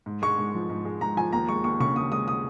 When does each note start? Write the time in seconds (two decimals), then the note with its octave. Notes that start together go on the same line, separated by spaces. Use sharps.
0.06 G#2
0.22 G#3 C#6
0.39 G#2
0.54 F3
0.70 G#2
0.85 G#3
1.01 G#2 A#5
1.17 F3 G#5
1.33 D#2 A#5
1.49 G#3 C#6
1.64 D#2 C#6
1.80 C#3 C#6
1.96 D#2 D#6
2.11 G#3 D#6
2.28 D#6